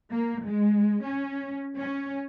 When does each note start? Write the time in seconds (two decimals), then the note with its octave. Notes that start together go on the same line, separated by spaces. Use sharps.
0.11 A#3
0.46 G#3
1.04 C#4
1.78 C#4